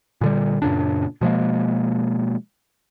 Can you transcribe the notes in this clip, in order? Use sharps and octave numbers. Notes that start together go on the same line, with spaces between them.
A#2 D3 G3
F#2 A#2 C#3 D4
B2 F3 G#3 A#3